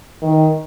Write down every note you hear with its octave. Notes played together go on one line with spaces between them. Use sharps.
D#3